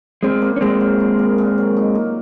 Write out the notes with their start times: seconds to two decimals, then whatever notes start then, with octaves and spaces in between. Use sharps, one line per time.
0.23 G#3 C4 F4
0.42 A#3
0.56 C#4
0.61 A#2 G#3 C4
0.81 F#3
1.00 F4
1.19 A#3
1.38 A#2
1.58 F#3
1.77 D#4
1.95 A#3